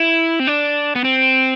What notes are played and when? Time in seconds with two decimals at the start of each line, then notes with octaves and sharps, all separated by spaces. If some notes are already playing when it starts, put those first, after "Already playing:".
Already playing: E4
0.40 C4
0.47 D4
0.96 B3
1.04 C4